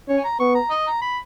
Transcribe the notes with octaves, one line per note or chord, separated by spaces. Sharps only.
C#4 C#5
G#5
A#5
B3 C#6
A#5
D#5
A#5
B5